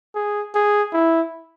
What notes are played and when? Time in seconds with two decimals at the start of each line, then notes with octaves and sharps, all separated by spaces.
0.15 G#4
0.55 G#4
0.93 E4